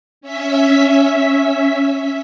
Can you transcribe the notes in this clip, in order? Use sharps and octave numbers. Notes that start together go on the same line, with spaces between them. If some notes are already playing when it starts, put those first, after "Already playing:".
C#4 E5 B6